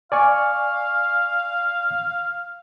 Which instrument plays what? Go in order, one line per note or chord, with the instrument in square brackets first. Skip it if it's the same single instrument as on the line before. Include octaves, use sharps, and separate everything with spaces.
[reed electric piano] D5 G#5 C#6 [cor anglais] F5